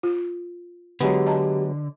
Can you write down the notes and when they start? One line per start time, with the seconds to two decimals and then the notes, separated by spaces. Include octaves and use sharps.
0.03 F4
1.01 D3 F#3 G#3 B3 G4
1.26 D#5 A5 A#5